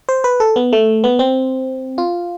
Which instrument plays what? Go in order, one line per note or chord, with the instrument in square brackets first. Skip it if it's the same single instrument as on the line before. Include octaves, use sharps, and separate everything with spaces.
[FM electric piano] C5
B4
A4
B3
A3
B3
C4
F4